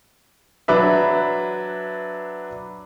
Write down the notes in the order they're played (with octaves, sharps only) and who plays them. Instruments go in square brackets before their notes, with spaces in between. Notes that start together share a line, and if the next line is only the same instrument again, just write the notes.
[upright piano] F#3 D4 B4 E5